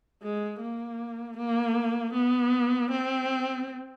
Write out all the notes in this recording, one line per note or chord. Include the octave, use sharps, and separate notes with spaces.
G#3
A#3
A#3
B3
C4